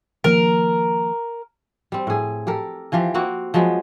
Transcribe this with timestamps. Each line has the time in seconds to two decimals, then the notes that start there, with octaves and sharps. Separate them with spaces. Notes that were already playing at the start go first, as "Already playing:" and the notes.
0.24 D#3 F3 A#3 A#4
1.92 G3 C4
2.07 A2 G#4
2.47 G4 A4 A#4
2.92 E3 F3 F4 G4
3.14 A#3 C4 F#4
3.54 F3 F#3 G#3 B3